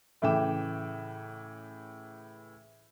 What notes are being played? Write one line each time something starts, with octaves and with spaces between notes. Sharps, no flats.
A2 C#3 E3 G5 D6 E7